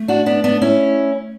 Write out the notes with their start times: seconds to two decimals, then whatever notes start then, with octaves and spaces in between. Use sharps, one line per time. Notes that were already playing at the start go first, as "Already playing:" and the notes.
Already playing: A3
0.08 D4 F#4
0.26 B3 D4
0.44 B3 D4
0.61 C#4 E4